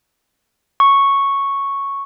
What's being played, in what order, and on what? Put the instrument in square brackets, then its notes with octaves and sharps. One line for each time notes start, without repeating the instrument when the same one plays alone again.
[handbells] C#6